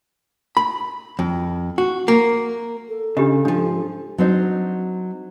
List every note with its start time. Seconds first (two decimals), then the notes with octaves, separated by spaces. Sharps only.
0.57 B5
1.19 F2
1.78 F#4
2.08 A#3
2.88 A4
3.17 C#3 D4 G4 D#5
3.45 G#2 F3 D4
4.18 F#3 C4 D4 D#4 C5